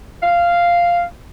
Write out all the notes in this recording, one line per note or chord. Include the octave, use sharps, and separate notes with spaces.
F5